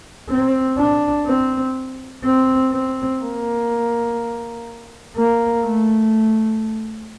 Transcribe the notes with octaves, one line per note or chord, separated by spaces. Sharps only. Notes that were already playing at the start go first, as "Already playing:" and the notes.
C4
D4
C4
C4
C4
A#3
A#3
A3